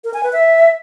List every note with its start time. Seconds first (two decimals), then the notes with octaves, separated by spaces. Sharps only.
0.04 A#4
0.14 G#5
0.23 B4
0.33 E5